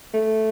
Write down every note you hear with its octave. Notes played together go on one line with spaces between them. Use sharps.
A3